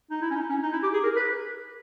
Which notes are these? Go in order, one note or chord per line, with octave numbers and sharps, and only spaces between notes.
D#4
E4
C#4
D#4
C#4
D#4
E4
G4
G#4
A#4
B4